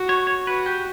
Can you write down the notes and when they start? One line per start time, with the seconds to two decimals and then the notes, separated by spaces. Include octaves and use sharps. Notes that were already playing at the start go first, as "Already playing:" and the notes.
Already playing: F#4
0.09 C#5
0.27 C#5
0.47 F#4 B4
0.66 G4